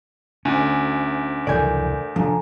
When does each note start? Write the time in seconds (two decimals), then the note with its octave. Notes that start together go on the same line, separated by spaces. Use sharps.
0.45 D2 C#4 G#5
1.47 F1 C#2 E3 A4 A#4 D5 G#5 G6
2.16 F1 F3 D4 A4 G#5 A#5